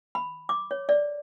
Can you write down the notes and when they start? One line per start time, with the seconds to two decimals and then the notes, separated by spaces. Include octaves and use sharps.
0.15 B5
0.49 D6
0.71 C#5
0.89 D5